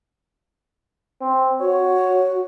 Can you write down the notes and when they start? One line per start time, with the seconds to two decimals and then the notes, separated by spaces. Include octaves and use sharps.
1.21 C4
1.60 F#4 C#5